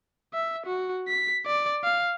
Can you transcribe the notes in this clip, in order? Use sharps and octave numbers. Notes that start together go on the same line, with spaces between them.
E5
F#4
B6
D5
F5